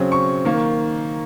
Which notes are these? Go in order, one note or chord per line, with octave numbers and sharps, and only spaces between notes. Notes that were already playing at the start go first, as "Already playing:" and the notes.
Already playing: C#3 F#3 C4
C#6
D#3 A#3